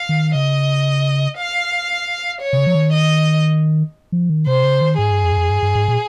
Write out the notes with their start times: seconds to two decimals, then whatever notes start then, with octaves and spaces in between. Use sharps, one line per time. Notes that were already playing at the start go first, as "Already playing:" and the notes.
Already playing: F5
0.09 D#3
0.35 C#3 D#5
1.38 F5
2.41 C#5
2.53 C3
2.58 C#3
2.67 F3
2.75 D#3
2.92 D#5
4.12 F3
4.30 D#3
4.47 C3 C5
4.64 C#3
4.81 D#3
4.98 G#2 G#4
5.11 G2
5.24 F2
5.32 G2
5.37 F2
5.50 G2
5.62 G2
5.75 G#2
5.88 A#2